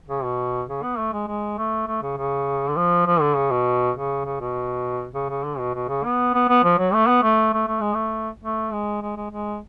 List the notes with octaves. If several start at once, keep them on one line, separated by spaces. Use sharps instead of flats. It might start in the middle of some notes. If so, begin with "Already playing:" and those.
C#3
B2
C#3
B3
A3
G#3
G#3
A3
A3
C#3
C#3
D3
F3
F3
D3
C#3
B2
C#3
C#3
B2
C#3
C#3
D3
B2
B2
C#3
B3
B3
B3
F3
F#3
A3
B3
A3
A3
A3
G#3
A3
A3
G#3
G#3
G#3
G#3